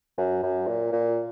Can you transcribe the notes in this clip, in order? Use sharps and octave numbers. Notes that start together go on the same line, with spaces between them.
F#2
F#2
A#2
A#2